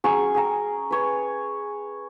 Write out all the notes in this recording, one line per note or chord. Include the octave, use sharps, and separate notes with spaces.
F#3 C#4 G#4 C#6
G#4 G5 A#5
B4 C#5